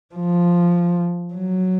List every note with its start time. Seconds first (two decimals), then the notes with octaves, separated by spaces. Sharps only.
0.15 F3
1.34 F#3